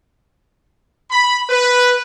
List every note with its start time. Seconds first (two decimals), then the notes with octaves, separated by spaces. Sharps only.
1.11 B5
1.49 B4